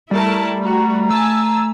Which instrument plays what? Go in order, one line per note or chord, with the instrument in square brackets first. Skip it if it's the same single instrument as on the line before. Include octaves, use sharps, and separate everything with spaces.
[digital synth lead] G3 [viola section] A3 A#4 A5 [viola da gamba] E4
[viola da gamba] A3 [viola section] F#4 [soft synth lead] A#5
[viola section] G#5 A5 [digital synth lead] E6